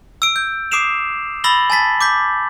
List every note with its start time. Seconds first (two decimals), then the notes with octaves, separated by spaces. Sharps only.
0.22 E6 D7
0.36 G6
0.71 D6 D#6 C7 D7 E7 F7
1.44 B5 E6 A6 A#6 F#7 G7
1.70 G#5 A5 A6 B6
2.01 D6 G6 B6